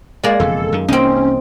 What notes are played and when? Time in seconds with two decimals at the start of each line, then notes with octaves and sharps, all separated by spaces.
0.23 G#3 A#3 D5
0.40 E1 F2 C#3 A4
0.73 F#2 D#3
0.88 C2 E3 A#3 C4 C#4 D#4